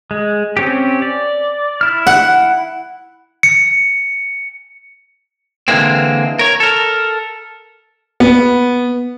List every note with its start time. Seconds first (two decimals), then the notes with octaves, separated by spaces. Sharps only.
0.11 G#3
0.57 C4 C#4 G4
1.02 D5
1.81 E4 F6
2.07 F#5
3.43 C#7
5.68 D3 E3 G#3 A#3 C4
6.39 A#4 C#5
6.60 A4 A#4
8.20 B3